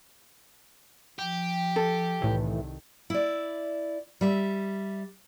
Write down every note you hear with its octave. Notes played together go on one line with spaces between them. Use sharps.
F3 G4
A4
C2 A2 D#3 E3
E4 D5
G3 E5